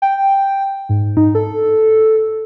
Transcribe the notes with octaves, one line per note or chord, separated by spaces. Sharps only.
G5
G#2
D#4
A4